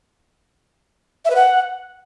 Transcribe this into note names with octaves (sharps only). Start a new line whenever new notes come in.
E5
B4
F#5